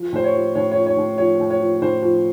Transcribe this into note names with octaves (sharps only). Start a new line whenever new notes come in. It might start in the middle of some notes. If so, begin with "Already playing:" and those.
Already playing: F3
A2 C5
C#5
F3
A2 C#5
C#5
F3
C#5
A2
F3 C#5
A2
C#5
F3
A2 C5
F3